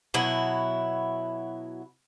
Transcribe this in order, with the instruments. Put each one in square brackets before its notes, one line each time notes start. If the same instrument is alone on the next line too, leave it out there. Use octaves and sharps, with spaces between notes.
[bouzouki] B2 F#3 E4